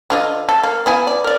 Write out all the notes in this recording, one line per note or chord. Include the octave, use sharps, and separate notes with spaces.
D3 F4 D#5
A4
A#3
B3 E4 G#5
D5
A#4 D5